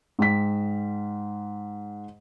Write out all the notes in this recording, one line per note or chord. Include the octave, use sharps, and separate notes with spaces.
G#2 G5 B6